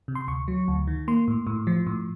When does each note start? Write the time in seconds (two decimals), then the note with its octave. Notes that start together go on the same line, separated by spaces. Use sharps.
0.08 C3
0.15 C6
0.28 D2 C#6
0.48 F#3
0.68 D2
0.87 D#3
1.08 A#3 C6
1.28 A2
1.47 A2
1.67 F3
1.87 A2